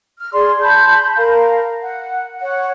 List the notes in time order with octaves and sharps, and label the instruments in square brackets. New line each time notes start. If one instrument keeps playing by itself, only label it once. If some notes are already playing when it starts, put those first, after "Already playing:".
[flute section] F6
G#4 D5 C6
A5 B5 C6 G6
A#4 F5
F#5
C#5 F#5